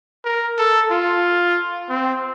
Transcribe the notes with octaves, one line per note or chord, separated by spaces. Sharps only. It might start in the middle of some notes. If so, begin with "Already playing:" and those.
A#4
A4
F4
C4